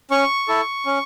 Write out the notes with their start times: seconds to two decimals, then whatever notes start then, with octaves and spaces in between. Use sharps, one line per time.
0.11 C#4 C#6
0.48 E4 A4
0.86 C#4